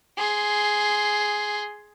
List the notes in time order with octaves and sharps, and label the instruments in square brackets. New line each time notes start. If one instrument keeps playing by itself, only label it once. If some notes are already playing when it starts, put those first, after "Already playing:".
[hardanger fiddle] G#4 C6